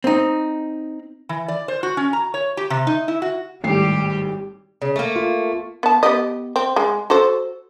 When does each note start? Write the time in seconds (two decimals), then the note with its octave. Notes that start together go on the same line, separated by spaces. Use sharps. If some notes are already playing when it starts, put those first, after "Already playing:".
0.04 C4 D#4
1.29 E3
1.48 D5
1.68 C5
1.83 F#4
1.97 C#4
2.13 A#5
2.34 C#5
2.57 G4
2.70 C3
2.87 D#4
3.08 E4
3.22 F#4
3.64 G#1 A2 G3 G4 C7
4.82 C#3
4.96 A3 A#3
5.16 F4
5.83 B3 A5
6.03 B3 G4 D#5
6.56 C4
6.76 G#3
7.10 F#4 A4 C5